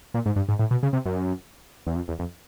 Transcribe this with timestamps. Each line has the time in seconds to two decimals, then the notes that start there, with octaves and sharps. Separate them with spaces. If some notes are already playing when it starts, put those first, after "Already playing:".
0.14 A#2
0.26 G#2
0.36 G2
0.49 G#2
0.59 A2
0.71 B2
0.83 C#3
0.93 C3
1.06 F#2
1.87 E2
1.96 F2
2.08 E2
2.19 F2